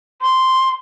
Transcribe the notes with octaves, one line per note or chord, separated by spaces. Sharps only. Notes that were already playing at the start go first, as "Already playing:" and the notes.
C6